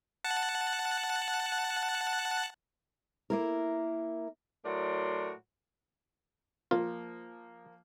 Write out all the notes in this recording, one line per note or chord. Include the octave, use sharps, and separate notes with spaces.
F#5 A5 F#6
A#3 E4 A#4
A2 F#3 F#4 A#4 D5 C6
F3 A#3 F4